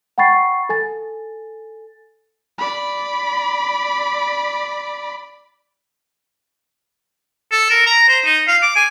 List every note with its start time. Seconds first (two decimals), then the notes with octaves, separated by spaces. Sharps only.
0.18 F#5 G5 B5 C#6 A6 C7
0.69 A4 G#5 A6
2.58 D5 B5
7.52 A4
7.70 A#4
7.86 A#5
8.09 C5
8.25 D#4
8.48 F5
8.62 D6
8.76 G#5